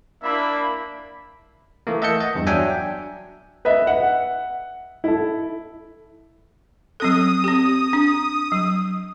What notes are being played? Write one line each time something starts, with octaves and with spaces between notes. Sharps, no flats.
A#3 D4 E4 E5 B5
E3 A3 A#3
D#5 E5 F#5 A5 G6 C#7
D#5
E2 G2
F#3 D4 E5 G5 G#5
B4 D#5 E5
F#5
E4 A4
F#3 C4 A4 D#6
C4 G4
D4
F#3